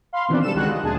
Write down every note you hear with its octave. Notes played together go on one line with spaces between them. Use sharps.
F5 B5 C6
B2 D#3 E3 B3 C4 D4
G3 A4 E7
C#2 D#3 G3 G#3 F#4 F#6
F4 D#5
D2 A#2 G#4 A5